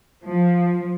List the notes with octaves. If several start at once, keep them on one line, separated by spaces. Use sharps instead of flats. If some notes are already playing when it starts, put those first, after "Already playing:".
F3